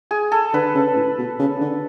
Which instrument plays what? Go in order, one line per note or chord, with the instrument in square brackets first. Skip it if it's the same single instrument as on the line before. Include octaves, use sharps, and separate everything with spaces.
[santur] G#4
A4
[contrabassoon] D3 [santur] B4
[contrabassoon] C#3
A2
B2
C#3
D3